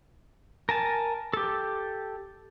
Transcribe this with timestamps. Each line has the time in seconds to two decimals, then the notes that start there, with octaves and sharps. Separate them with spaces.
0.69 A#4 G#5 A5
1.33 G4 A4